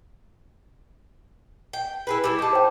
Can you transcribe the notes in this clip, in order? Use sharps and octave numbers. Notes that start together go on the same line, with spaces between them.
G5
E4 G#4 B4
G3 E4 G#4
D#4 A5 D6
C5 G5